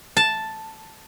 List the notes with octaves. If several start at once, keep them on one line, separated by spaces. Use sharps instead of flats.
A5